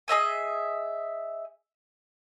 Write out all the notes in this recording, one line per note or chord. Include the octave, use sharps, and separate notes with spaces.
G#4 D#5 E5 G#5